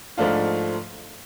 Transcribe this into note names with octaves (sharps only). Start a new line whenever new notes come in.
G#2 F3 A3 D4 F4